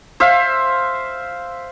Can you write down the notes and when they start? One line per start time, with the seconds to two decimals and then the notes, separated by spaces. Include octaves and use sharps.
0.20 C5 E5 F5